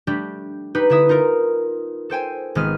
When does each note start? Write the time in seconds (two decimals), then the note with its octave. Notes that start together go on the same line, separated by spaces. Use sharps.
0.07 G3 A3 D4 G4
0.75 D#4 G4 B4
0.90 D3 B3 E4 E5 D#6
1.09 D#4 F4 A#4
2.10 A4 C5 G5 G#5
2.55 G#1 G#3 B3 F6 D#7